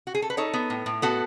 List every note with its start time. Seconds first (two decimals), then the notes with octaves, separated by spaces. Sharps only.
0.07 F#4
0.15 G#4
0.22 A4
0.30 B4
0.37 D#4 A4 C#5
0.54 B3
0.70 A2
0.86 A2
1.02 B3 F#4 A4